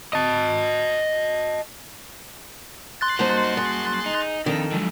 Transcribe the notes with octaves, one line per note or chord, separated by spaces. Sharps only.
D#5 A5
C6 F#6 A6
F#2 G3 A#3 D#4 F#4 C5 A5
G#4
D#4
F2 D#3 D4 A4
G#2 D3 F3 F#3